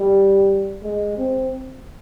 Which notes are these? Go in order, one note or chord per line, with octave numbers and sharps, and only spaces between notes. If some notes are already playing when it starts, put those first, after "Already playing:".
Already playing: G3
G#3
C4